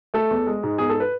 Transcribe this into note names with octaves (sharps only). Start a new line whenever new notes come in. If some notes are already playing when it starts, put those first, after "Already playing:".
A3 A4
E2
G#3
G#2
E2 G#4
A4
B4